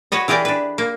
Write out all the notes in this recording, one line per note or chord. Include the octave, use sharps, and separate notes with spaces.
F#4 B4 C#5 D#5
E3 G4 G#4 A#4 D5
D4 B4
A#3